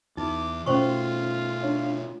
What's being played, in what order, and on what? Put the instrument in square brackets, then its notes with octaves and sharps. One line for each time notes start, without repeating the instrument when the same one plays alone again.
[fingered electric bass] E2 [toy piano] D#4 [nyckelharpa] D6
[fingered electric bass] B2 A3 [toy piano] C#4 C5 C#6 [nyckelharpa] F4
[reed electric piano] D4 C#5 F5